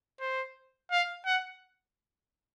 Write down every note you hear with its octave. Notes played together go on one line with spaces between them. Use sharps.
C5
F5
F#5